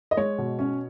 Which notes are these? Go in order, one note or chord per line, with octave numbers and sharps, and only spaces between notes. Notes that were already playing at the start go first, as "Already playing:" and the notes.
D#5
G#3 C#5
B2
C#4